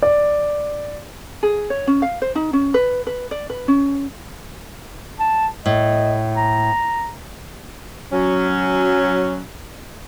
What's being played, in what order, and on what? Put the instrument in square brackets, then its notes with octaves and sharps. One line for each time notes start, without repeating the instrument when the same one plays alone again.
[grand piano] D5
[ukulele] G#4
C#5
C#4
F5
C5
D#4
C#4
B4
B4
D5
B4
C#4
[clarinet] A5
[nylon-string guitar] A2 [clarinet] D#5
[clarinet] A#5
[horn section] F#3 C#4